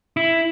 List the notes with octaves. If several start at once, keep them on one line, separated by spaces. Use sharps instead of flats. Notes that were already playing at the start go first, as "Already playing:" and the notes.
E4